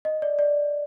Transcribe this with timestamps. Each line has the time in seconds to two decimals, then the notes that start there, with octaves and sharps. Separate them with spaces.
0.05 D#5
0.22 D5
0.39 D5